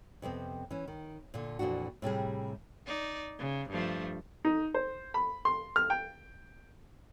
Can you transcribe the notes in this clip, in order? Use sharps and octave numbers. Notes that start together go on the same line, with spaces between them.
F2 C3 B3 C4
E3 C#4
D#3
A#2 D3
F2 A#2 E3 D4 F#4
A2 C3 G3 G#4
D#4 D5
C#3
G2 F3 A3
D#4
C5
B5
C6
F6
G5